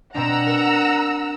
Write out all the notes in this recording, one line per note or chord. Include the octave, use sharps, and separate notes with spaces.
B2 C4 D4 F#5 A#5 E6
A#4